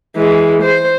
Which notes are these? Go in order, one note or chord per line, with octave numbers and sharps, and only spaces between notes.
E3 G#3
C5